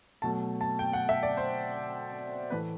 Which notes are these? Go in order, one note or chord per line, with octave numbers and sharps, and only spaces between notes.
B2 F#3 A3 A5
A5
G5
F#5
E5
D5
C5
A2 E3 A3 B4